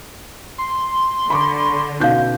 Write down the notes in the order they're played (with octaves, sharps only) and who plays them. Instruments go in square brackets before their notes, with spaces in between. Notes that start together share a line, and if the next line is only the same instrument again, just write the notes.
[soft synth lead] C6
[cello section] D3 [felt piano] B5 C#6 D6
[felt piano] B2 G6 [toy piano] C#4 D#4 F5